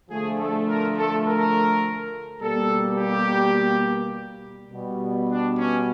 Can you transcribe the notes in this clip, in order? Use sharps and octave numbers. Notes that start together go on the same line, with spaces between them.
D3 F3 A3 G#4
A4
A#4
A4
A#4
B2 G3 A#3 A4
G4
B2 G3 B3
D4
C#4